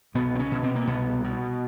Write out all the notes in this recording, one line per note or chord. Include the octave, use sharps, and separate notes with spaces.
C2 B2 B3
C4
C#3 C#4
B2
C3 C4
A#3
C2 B2 B3
B2